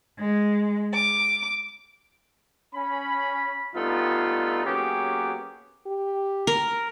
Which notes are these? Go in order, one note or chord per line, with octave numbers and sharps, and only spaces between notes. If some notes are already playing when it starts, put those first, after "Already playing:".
G#3
D6
C#4 B5
G2 G3 A3 B3 D#4 F4
F#3 A#3 B3 C#4 G4 G#4
G4
A#4